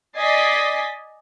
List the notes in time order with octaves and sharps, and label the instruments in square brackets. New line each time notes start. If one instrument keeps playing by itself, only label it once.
[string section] D5 D#5 G#5 A6 B6 C7